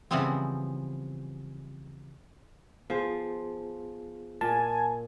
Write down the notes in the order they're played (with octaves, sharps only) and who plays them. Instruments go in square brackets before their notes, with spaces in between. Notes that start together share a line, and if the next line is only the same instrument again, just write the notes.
[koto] C#3 E3 F3 G3 B3 C4
[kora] F3 C5 [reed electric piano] B3 F4 G#4
[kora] A#2 [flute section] G#5 [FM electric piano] A5